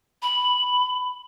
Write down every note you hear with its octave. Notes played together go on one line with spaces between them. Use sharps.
B5